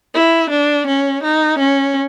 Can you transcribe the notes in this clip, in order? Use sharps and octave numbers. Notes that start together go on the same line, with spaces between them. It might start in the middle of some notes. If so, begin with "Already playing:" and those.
E4
D4
C#4
D#4
C#4